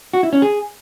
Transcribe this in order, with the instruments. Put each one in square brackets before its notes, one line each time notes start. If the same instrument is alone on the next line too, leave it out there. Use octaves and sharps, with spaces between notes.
[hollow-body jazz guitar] F#4
E4
C#4
G#4